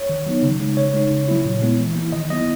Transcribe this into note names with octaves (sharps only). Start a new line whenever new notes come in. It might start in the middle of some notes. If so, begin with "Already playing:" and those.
Already playing: C#5
D#3
F#3 B3 D#4
C#3
G#3 D#4
C#3 C#5
G#3 D#4
C#3
F#3 A#3 E4
A#2
G#3 B3 E4
E3
A#3 E4
D#3 D#5
F#3 B3 E4 D#5